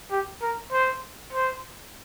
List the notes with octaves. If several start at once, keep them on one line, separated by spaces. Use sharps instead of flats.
G4
A#4
C5
C5